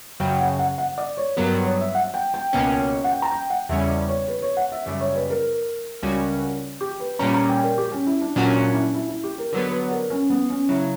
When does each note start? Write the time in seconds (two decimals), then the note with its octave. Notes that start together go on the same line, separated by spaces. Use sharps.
0.20 F#2 C#3 F#3 G5
0.40 F#5
0.59 F#5
0.78 F#5
0.98 D5
1.17 C#5
1.37 G2 F#3 B3 A#4
1.66 C#5
1.81 E5
1.95 F#5
2.14 G5
2.34 G5
2.53 C#2 B2 A#3 C#4
3.04 F#5
3.11 G5
3.22 A#5
3.31 G5
3.50 F#5
3.69 E2 C#3 G3 C#4 E5
3.89 D5
4.09 C#5
4.28 B4
4.42 C#5
4.57 F#5
4.72 E5
4.86 F#2 C#3 G3 E5
5.01 C#5
5.15 B4
5.30 A#4
6.03 C#2 C#3 G3 C#4 F#4
6.81 G4
7.00 B4
7.19 A#2 G3 C#4 A#5
7.34 A#5
7.49 G5
7.63 A#4
7.78 G4
7.92 C#4
8.07 E4
8.21 D4
8.36 A#2 F#3 C#4 D4 F#4
8.65 D4
8.73 E4
8.80 D4
8.94 E4
9.09 E4
9.24 G4
9.38 A#4
9.52 D3 F#3 B3 B4
9.71 B4
9.91 A#4
10.10 C#4
10.30 B3
10.50 C#4
10.69 C#3 F#3 E4